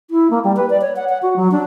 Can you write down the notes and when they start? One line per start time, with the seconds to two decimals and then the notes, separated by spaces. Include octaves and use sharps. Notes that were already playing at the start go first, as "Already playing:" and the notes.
0.10 E4
0.30 A#3
0.44 G3
0.56 B4
0.70 D5
0.81 C#5
0.96 F#5
1.09 F#5
1.22 F#4
1.36 F#3
1.51 D4